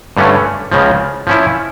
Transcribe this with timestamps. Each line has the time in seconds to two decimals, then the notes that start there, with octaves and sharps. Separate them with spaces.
0.17 G2 D3 A3 C#4
0.72 C#2 C#3 F3
1.27 F3 C#4 E4